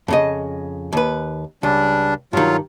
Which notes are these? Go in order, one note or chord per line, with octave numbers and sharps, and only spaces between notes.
F2 C#3 D#5
D#2 B4
C#2 G3 D4
G2 D#3 F#3 F4